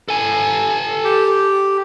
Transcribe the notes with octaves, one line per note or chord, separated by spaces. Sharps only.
A4 G#5
G4